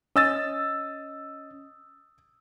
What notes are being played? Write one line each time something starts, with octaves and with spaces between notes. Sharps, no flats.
C#4 D#5 D#6 E6 A6